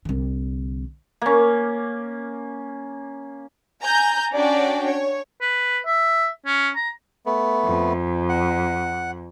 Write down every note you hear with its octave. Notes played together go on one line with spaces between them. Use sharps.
C2 D3
A#3 C#4
G#5 A#5 G6
C#4 D4 F#4 D5 G5
C#5
B4
E5
C#4
A#5
A3 B3
F2
F#5